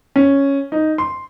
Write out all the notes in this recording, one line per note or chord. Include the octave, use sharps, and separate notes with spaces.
C#4
D#4
C6